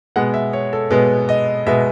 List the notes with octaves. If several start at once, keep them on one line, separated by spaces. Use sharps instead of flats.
B2 G#3 B3 F#5
E5
C#5
A4
B2 G#3 B3 B4
D#5
B2 G#3 B3 E5